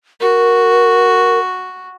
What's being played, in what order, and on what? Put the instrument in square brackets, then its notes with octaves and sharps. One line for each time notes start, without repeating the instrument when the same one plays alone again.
[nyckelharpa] F#4 [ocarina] A#4